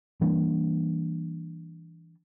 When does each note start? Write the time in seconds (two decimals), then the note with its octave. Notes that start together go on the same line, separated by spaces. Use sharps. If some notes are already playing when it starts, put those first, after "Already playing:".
0.21 E3 G3 A#3 D4